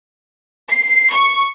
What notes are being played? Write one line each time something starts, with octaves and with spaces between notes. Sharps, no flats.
C7
C#6